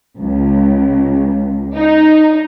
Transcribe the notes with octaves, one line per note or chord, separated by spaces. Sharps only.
C#2
D#4